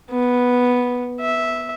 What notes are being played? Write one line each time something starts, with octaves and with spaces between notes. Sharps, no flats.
B3
E5